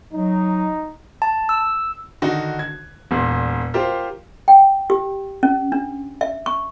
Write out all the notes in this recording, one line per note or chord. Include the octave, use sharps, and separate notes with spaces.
F#3 D#4
A5
E6
D3 D#3 D#4 F#4
G#6
E1 A#2
F4 G4 A#4 C5
G5
G4
C#4
D4
E5
C#6